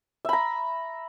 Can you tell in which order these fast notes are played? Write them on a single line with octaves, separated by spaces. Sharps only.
E5 B5 A#5